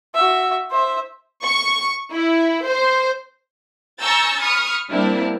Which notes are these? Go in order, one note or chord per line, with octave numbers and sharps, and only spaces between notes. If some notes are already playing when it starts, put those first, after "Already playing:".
F#4 E5
C5 E5
C#6
E4
C5
G#5 A#5 C#6 E6 G6 A6
B5 C#6 D#6 F6
G3 A#3 C4 D4 E4